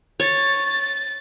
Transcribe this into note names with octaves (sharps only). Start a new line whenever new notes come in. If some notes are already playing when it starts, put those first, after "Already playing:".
C#5 A6